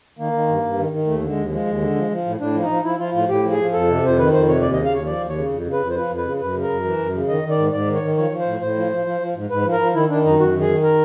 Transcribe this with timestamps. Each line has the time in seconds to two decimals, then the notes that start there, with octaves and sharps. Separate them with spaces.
0.19 D#3 A#3
0.33 D#3
0.48 G2
0.63 G2
0.77 D#3
0.92 D#3
1.07 D#2 A3
1.22 D3
1.29 G#3
1.37 D#2
1.51 F3 G#3
1.66 D#2
1.80 D3
1.96 F3
2.11 F3
2.26 A2
2.40 A2 D4
2.55 F3
2.63 D#4
2.70 F3
2.84 F3 E4
2.99 F3 F4
3.14 A2 F4
3.29 A2 G4
3.43 F3
3.51 G#4
3.58 F3
3.73 F2 A4
3.88 C3
4.03 F2 C5
4.18 D#3 B4
4.33 F2 C5
4.47 C3 C#5
4.62 D#2 D5
4.73 D#5
4.77 C#3
4.85 F5
4.92 D#2 C#5
5.06 F3 D5
5.21 D#2
5.29 C#5
5.36 C#3
5.51 F2
5.65 C#3
5.73 B4
5.80 F2
5.90 C5
5.95 F3 B4
6.10 F2
6.17 B4
6.25 C#3
6.40 F#2 B4
6.54 C#3
6.62 A#4
6.69 F#2
6.84 E3
6.98 F#2
7.14 C#3
7.28 D#3 D#5
7.44 D#3
7.50 D5
7.58 G#2
7.73 G#2 D5
7.88 D#3
7.95 C#5
8.02 D#3
8.17 F3 C#5
8.32 F3
8.39 C5
8.46 A2
8.61 A2 C5
8.76 F3
8.91 F3
9.06 F3
9.20 F3
9.35 G#2
9.50 G#2 B4
9.65 F3
9.72 A#4
9.80 F3
9.94 D#3 E4
10.09 D#3 D4
10.24 F#2 D#4
10.39 F#2 F#4
10.54 D#3
10.61 G#4
10.68 D#3
10.83 A#4